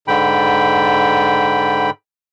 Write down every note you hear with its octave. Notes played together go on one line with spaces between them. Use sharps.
G#2 D3 G5 B5